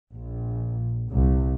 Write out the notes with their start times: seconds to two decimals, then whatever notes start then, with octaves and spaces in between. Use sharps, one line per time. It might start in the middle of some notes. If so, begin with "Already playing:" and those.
0.15 A#1
1.10 C2